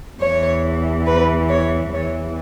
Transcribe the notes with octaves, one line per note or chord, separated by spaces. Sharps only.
E2 E3 C#5
B4
C#5
E2 E3 C#5